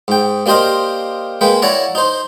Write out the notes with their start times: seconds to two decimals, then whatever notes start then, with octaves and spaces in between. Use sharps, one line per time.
0.08 G#2 G5
0.46 A#3 D4 G4 C5 D#5 F5
1.41 G#3 A#3 B4 G5
1.62 E4 C#5 D5 F#5 A#5
1.95 D#4 C5